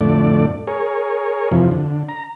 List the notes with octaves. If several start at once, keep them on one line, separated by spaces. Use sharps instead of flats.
F2 A2 D3 A3 D5
G#4 A#4 C#5
F2 C3 E3 F3
D3
A#5